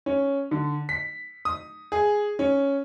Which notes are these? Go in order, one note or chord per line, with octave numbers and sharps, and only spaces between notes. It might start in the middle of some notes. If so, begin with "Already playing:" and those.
C#4
D3
B6
D#6
G#4
C#4